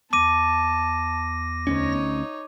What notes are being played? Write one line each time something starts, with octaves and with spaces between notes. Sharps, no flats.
E2 A5 D6 A#6 D#7
D2 B3 C#4 D#4 C#5